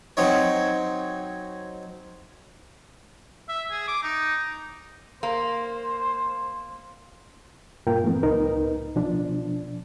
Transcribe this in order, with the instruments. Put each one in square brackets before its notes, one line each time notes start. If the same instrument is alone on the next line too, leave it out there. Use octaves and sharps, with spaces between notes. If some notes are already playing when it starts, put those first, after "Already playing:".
[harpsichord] F#3 C4 D#4 C#5
[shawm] E5
G#4
D6
D#4
[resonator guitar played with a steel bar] A#3 [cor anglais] C5
[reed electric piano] G2 A#2 A#3 F4 A#4 G5
E3 F3 A3 B3 C4
C#2 A2 D#4 A#4 B4
B2 F3 D4